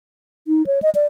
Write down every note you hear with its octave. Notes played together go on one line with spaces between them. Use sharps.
D#4
C#5
D#5
D5